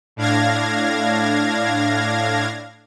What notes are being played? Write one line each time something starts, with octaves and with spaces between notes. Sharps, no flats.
A2 D4 F5 G#6 A#6